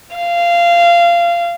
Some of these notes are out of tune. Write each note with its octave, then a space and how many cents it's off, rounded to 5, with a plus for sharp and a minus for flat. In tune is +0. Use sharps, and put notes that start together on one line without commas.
F5 -20